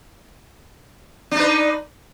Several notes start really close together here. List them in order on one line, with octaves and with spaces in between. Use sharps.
D4 D#4 B4